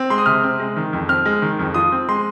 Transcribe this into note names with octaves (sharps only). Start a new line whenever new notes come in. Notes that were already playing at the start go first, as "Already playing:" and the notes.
Already playing: C4
G#3 C6
D#6
C3 F6
C4
G#3
D#3
F2
C4 F6
G#3
D#3
F2
F4 D#6
C4
G#3 C6